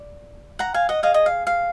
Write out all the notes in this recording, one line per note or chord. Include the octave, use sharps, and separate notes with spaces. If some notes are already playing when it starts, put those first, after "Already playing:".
Already playing: D5
F#5 A#5
F5 G#5
D#5 F#5
G#4 D#5 F5
D#5
F5
F5